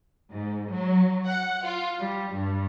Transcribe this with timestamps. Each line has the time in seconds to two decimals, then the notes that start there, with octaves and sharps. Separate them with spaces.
0.31 G#2
0.72 F#3
1.28 F#5
1.65 F4
1.98 G3
2.33 G2